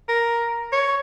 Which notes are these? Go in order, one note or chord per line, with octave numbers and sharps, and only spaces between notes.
A#4
C#5